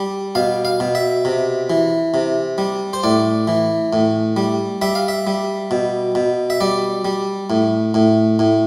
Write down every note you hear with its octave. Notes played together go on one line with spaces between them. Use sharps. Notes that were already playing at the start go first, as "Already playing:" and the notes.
Already playing: G3
B2 F5
F5
B2
E5
C3
E3
C3
G3
C5
A2 D5
E3
A2
G3
G3 E5
F5
E5
G3
B2
B2
E5
G3 D5
G3
A2
A2
A2